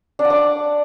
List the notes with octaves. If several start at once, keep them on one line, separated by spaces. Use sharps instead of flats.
D4
F#5
D5